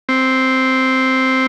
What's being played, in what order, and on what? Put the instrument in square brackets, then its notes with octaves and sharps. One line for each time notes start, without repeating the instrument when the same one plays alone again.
[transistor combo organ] C4